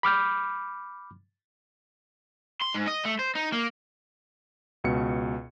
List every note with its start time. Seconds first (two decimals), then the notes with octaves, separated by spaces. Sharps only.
0.03 B5 D6 F6 G6
2.61 C6
2.74 G#2
2.87 D#5
3.05 A3
3.19 C5
3.36 D#4
3.53 A#3
4.84 C#2 B2 C#7